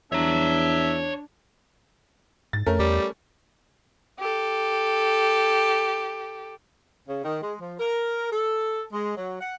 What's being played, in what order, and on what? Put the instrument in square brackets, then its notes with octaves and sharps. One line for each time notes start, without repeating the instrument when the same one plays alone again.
[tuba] E2 [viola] D4 [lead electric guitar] C#5 A#5 [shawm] E5
[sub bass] G#2 [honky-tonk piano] A6
[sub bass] F2 [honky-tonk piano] A3 C#4 A#4
[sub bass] E2 [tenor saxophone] G3
[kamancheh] G4 A4
[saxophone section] C#3
D#3
G#3
F3
A#4
A4
G#3
F#3
F#5